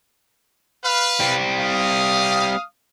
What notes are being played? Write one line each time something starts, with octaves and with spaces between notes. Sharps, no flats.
B4 F5
G3 C4
F5 D#6